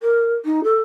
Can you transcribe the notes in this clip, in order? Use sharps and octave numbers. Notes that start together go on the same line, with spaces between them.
A#4
D#4
A4